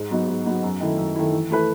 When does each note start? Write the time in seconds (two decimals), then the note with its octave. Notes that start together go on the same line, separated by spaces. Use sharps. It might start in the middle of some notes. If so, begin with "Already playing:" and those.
Already playing: G#2
0.10 F#3 B3 D#4
0.28 G#2
0.46 F#3 B3 D#4
0.63 F#2
0.81 D#3 A3 E4
0.98 F#2
1.16 D#3 A3 E4
1.33 E3
1.50 A3 E4 B4